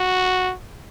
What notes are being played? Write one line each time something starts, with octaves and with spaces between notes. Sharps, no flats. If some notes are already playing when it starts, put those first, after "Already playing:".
Already playing: F#4